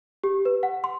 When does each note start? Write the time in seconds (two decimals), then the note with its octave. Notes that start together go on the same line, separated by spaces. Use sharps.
0.24 G4
0.45 B4
0.63 F#5
0.84 C6